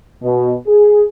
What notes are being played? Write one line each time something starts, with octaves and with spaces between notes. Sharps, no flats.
B2
G#4